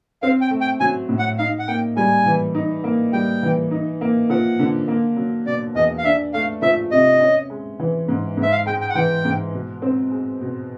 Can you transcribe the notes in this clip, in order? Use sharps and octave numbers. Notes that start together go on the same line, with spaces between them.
C4 F5
G5
A3
G5
F#3 G#5
A2
F#5
D#4 F5
F#5
A#3 G5
G3 G#5
E3
D#4
A#3
G3 G5
E3
D#4
A#3
F3 F#5
D3
A#3
F#3
B2 D5
E2 D#5
F5
D4 E5
A3 F5
F3 E5
C3 D#5
C#4
G#3
E3
G#2
G#2
E5
F5
G#3 G5
G5
F#5
E3 G5
G#2
B2
C4
G#3
B2